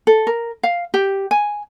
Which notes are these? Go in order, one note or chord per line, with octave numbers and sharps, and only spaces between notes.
A4
A#4
F5
G4
G#5